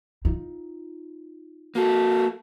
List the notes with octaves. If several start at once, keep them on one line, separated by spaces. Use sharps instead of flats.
D#4 F4
A#3 F#4 A4